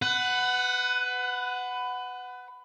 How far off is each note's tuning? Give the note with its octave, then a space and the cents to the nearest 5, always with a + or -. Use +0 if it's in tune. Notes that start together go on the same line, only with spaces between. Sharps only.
B4 +20 F#5 +0